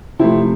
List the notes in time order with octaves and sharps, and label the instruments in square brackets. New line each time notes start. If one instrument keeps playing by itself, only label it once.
[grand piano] C3 F3 A3 C4 E4